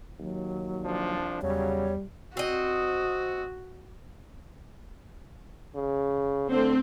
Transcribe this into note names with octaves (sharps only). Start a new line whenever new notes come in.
D#2 F#3
C2 F3 D4
E2 C#3 F#3 G3 C#5
C4 F#4 D#5
C#3
D3 A3 C4